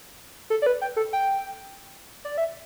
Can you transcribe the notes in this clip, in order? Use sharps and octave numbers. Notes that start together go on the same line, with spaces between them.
A4
D5
B4
G5
A4
G5
D5
E5